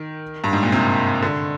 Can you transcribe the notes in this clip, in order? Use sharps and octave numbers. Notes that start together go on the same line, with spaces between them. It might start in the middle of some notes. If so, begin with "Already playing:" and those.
Already playing: D#3
G2
G#2
A#2
C3
D3